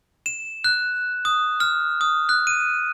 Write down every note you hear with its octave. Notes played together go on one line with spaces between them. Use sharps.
E7
F#6
D#6
F6
D#6
F#6
D#7